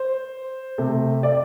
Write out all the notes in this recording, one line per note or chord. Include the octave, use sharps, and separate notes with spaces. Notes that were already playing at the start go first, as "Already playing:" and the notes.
Already playing: C5
C3 A3
D5